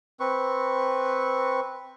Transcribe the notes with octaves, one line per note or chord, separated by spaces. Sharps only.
C4 B4 C#6